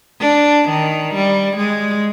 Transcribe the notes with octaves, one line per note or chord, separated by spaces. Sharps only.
D4
D#3
G3
G#3